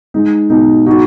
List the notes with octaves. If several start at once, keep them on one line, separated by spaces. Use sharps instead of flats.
G#3 D#4
B2 D#4
D#4 F#4